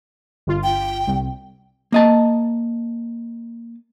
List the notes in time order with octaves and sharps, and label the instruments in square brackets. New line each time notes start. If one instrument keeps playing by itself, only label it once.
[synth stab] G1 F4
[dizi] G5
[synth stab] C2
[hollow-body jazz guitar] A#3 D#5 A5